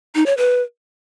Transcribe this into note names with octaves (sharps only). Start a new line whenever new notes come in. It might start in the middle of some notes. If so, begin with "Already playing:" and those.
D#4
C#5
B4